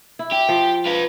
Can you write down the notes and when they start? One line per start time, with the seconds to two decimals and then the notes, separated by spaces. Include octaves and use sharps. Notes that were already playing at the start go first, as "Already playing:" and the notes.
0.19 E4
0.31 G4
0.49 F3
0.86 B4 F5